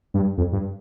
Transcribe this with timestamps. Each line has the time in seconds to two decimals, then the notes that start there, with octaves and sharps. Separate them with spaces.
0.14 G2
0.37 F2
0.52 G2